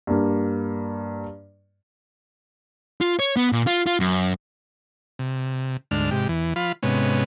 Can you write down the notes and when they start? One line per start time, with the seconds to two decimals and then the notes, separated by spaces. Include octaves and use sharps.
0.07 G2 A#3
3.01 F4
3.19 C#5
3.36 B3
3.52 A#2
3.67 F4
3.87 F4
4.00 F#2
5.19 C3
5.91 D2 G#2 D4 F6
6.11 G#2 C3 G4
6.29 E2 E3
6.56 F3 F4 F5 B5
6.83 G#2 C3 B3 C#4